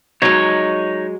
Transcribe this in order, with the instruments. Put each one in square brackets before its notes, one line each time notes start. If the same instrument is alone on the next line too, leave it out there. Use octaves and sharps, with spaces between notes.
[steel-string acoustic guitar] F#3 G#3 [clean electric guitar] D#4 C#5